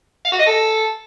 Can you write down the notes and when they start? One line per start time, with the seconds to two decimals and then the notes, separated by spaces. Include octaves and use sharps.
0.25 F5
0.32 F#4
0.39 D#5
0.46 A4